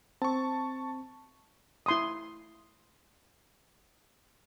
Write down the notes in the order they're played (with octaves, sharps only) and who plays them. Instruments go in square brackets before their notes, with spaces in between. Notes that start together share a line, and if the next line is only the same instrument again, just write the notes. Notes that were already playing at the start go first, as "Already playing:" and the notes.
[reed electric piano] C4 [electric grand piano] A5 C#6
[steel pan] E4 C6 D#6